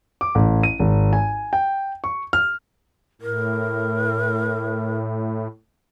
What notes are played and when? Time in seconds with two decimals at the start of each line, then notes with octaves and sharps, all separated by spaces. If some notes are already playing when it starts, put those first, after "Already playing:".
0.21 D6
0.35 A1
0.63 D#7
0.79 G#1
1.13 G#5
1.53 G5
2.04 C#6
2.33 F6
3.21 A2 A#4